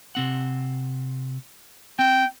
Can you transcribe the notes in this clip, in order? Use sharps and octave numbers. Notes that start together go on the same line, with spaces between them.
C3 C4 F#5
C4 G5